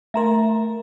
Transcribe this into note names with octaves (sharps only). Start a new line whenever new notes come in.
A3 A#4 E5 A#5 C6